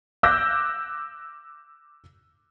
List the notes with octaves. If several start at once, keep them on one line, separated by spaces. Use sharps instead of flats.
D6 E6 F#6 G6 A#6